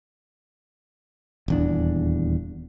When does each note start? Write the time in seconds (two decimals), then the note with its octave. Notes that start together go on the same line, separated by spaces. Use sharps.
1.48 D#1 E2 D4